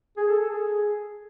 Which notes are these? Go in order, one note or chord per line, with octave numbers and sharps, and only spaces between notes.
G#4
A4
A4
G#4